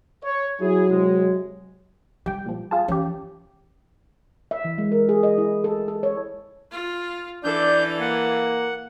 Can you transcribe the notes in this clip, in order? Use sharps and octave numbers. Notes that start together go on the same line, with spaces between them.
C#5
F#3 E4 G#4
C3 G#3
G3 G4 G5
A#2 F3
F4 G#4 A5
E3 C#4 G4
E5
E3
G#3
A#4
G#4
D#5
E4
A4
A4
C#5
F4
E3 D4 A4 D5 G6
A#3 F#5